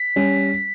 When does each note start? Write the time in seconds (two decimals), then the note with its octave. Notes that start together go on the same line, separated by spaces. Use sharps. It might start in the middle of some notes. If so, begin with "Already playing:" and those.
Already playing: B6
0.16 G3 C#4